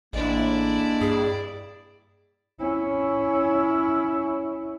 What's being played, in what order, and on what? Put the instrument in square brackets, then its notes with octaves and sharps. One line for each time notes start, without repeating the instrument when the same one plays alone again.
[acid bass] A1 [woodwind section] G#3 A#3 D4 [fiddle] E4 D5
[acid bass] G2 [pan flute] G#4
[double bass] C#4 E4